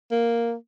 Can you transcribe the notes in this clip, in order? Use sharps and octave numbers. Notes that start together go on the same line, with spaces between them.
A#3